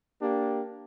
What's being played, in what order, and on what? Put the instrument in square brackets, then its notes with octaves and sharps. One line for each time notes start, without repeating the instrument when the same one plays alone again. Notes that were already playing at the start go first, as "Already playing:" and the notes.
[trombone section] A#3 D4 G4